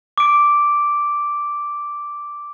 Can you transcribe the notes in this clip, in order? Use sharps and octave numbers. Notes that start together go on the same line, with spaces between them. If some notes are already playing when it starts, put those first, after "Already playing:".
D6 D7